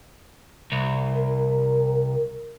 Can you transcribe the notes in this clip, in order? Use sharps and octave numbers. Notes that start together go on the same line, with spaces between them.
C2
A#4